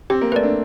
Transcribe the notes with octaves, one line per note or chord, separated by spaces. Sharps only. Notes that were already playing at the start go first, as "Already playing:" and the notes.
C4 G4
A#3
A3 B4 D5
D4